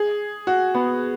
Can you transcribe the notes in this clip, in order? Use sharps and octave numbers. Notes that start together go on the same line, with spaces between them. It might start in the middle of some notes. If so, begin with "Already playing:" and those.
Already playing: G#4
F#4
B3